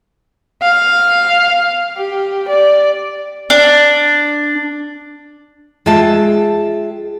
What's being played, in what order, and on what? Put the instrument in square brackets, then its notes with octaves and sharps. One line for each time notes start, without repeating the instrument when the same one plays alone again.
[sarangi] F5
G4
D5
[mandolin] D4
[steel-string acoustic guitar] G#3 F4 G#4 E5 G5 A5